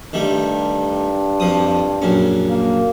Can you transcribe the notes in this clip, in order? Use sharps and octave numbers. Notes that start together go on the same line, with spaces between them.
G2 D#3 G3 A3
F2 F3 D#6
A#1 F#2 C#4
A#3